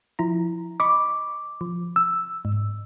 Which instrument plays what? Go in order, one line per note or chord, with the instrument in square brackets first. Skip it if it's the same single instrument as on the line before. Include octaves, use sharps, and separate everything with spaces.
[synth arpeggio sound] F3 E4 A#5
[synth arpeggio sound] D#5 B5 C#6 [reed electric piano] D6
[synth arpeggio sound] F3
[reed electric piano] E6
[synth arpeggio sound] G#2